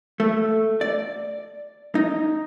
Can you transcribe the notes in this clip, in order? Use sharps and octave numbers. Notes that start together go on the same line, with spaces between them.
A3
D5
D#4